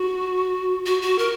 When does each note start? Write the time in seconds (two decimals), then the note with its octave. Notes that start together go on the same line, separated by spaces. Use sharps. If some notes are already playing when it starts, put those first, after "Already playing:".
Already playing: F#4
0.86 F#4
1.02 F#4
1.19 A#4